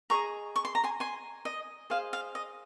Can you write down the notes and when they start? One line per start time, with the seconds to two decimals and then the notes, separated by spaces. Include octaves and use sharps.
0.10 G#4 D#5 A#5 C#6
0.56 C#6
0.65 C6
0.75 A#5
0.84 G#5 C6
1.00 G#5 C6
1.45 D#5
1.90 G#4 C5 D#5 F5
2.13 F5
2.35 D#5